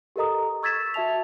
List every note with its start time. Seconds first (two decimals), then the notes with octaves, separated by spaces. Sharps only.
0.16 G4 A4 A#4 D#5 A#5 D#6
0.63 C#6 E6 G#6 A6 B6 E7
0.94 F#4 E5 A5 F7